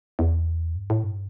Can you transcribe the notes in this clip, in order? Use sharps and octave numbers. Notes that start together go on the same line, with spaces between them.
E2
G2
A2
G2